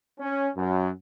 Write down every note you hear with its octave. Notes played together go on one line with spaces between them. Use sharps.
C#4
F#2